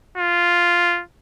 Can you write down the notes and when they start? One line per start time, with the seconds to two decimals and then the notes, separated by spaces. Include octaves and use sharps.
0.18 F4